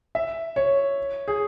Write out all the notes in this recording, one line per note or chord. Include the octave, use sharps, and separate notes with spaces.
E5
C#5
G#4